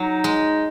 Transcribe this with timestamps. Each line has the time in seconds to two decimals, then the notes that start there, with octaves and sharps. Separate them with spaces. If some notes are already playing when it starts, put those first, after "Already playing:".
Already playing: F#3 D#4
0.24 G#3